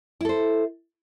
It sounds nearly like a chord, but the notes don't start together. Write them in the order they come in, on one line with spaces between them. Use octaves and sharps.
E4 A4 C5